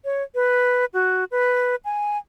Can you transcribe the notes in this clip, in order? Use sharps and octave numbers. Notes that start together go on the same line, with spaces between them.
C#5
B4
F#4
B4
G#5